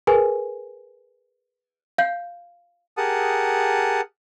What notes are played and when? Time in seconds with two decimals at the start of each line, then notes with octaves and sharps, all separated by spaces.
0.07 G#4 A#4 B4 G#5
1.98 F5 G6 C7
2.97 G4 G#4 A#4 F#5 A5 D#6